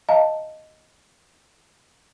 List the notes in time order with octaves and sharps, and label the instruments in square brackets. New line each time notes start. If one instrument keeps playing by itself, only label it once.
[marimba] D#5 F5 A5 A#5